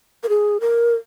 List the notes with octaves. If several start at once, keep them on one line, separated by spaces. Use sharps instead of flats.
A#4
G#4
A#4